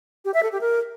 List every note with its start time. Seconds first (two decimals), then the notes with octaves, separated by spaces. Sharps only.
0.25 G4
0.34 E5
0.43 A4
0.52 G4
0.61 A#4